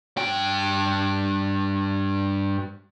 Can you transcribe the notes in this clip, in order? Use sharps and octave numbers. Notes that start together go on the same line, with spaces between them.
G2 G5